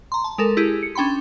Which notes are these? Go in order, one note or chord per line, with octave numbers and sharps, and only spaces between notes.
A#5 C6
A5
G#3 A4 A#4
E4 G4 G#4
C#7
C#4 D4 G5 B5 C6